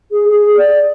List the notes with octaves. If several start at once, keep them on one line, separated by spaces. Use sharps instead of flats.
G#4
G#4
D5